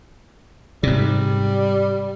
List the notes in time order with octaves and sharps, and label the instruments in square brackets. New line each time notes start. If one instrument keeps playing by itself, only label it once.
[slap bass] G#2 C3 [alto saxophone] G3